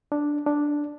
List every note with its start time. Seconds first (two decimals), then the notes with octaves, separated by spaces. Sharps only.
0.12 D4
0.46 D4